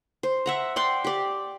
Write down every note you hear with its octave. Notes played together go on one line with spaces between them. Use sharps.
C5
E5 F#5 A#5
D5 F#5 G5 C6
G4 D5